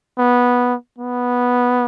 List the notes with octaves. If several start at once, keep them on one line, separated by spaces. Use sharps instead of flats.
B3
B3